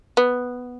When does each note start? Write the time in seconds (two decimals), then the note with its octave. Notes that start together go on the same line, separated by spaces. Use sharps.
0.17 B3